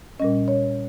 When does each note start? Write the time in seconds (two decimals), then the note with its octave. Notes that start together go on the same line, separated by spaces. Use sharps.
0.20 A#2 G3 C#4 D#5
0.48 C#5